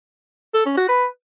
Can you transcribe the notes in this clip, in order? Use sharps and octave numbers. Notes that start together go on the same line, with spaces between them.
A4
C#4
F#4
B4